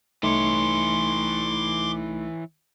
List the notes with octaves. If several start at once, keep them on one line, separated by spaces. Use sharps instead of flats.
C2 E3 A3 D#4 C#5 C6 D6